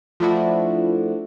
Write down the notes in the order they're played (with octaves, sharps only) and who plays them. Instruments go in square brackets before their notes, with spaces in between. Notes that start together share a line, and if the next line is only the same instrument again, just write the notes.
[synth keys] F3 A3 D4 E4 F#4